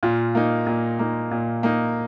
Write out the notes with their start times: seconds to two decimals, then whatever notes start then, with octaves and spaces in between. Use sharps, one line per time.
0.03 A#2 F4
0.35 A#3 D#4
0.67 A#2
0.99 A#3 D#4
1.31 A#2
1.63 A#3 D#4